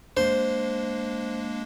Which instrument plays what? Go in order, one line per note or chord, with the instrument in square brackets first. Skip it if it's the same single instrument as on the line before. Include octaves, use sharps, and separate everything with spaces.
[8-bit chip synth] G#3 A#3 D4 [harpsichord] C5